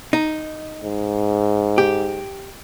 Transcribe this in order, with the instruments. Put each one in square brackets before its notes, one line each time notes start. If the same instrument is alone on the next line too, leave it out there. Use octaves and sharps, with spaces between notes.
[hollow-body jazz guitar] D#4
[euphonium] G#2
[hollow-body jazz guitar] G4